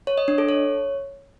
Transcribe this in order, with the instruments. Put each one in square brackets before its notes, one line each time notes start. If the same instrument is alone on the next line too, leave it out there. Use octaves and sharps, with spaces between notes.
[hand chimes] C#5
D#5
D4
A4
C#5